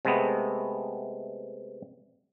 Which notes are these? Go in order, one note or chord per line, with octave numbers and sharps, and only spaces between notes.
C3 G#3 A3 B3